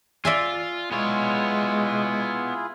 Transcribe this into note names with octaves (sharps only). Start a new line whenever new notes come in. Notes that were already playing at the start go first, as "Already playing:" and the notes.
F4 D5 E5 G#5
G#3 B3 E4 F4 G#4 C#5